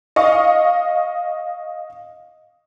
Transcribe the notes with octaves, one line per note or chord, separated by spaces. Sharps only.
D#5 F5 C#6